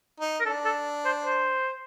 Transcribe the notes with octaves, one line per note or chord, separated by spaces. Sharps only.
D#4
A#4
D4 A4
A4
C5
C5